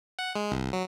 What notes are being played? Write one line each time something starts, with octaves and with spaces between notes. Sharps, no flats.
F#5
G#3
C2
F#3